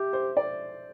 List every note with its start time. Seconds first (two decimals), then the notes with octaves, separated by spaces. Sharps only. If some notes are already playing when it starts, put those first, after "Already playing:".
Already playing: G4 E5
0.13 C5
0.37 D5